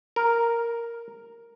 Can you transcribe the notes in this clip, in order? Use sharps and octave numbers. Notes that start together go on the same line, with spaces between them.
A#4